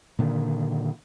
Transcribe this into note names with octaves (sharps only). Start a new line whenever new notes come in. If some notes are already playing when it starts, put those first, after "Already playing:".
A#2 D3 D#3